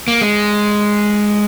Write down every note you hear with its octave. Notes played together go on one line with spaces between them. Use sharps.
A#3
G#3